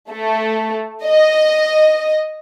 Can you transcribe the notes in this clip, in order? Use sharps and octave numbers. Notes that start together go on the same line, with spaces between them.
A3
D#5